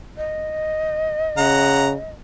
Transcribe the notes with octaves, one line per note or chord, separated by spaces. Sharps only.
D#5
C#3 F#5 A#5